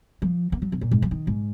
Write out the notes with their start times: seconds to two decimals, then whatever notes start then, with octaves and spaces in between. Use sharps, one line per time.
0.22 F3
0.52 A#3
0.62 F#3
0.72 C3
0.81 A#2
0.91 G#2
1.02 F3
1.11 D#3
1.27 G#2